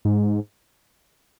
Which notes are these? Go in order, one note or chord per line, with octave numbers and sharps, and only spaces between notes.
G#2